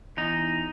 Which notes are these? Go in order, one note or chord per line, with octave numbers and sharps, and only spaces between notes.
E2 D#4